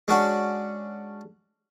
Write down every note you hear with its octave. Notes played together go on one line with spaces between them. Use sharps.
G#3 C#4 D4 F#4 F#5